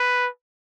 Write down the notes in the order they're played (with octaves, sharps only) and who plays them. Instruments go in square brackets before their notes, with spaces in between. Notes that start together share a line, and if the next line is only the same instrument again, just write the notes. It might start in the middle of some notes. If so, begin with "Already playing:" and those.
Already playing: [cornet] B4